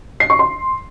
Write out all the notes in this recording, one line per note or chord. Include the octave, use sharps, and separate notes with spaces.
C7
C#6
C6